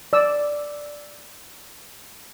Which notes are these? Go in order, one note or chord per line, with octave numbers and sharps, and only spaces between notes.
D5 E6